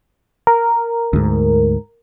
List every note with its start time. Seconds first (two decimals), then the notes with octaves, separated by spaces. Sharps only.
0.47 A#4
1.13 D2 G#2